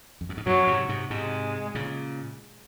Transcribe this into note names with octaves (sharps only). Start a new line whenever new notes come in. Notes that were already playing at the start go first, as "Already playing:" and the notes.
F2
F#2
G#2
F#2 A#2 F#3
G#2 C3
G#2 C3
G#2 C3 G#3
A#2 C#3